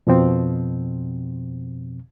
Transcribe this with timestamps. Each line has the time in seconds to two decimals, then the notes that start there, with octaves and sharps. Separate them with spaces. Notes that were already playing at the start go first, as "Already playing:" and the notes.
0.07 F2 B2 F3 C4